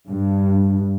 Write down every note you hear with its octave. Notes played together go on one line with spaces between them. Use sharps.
G2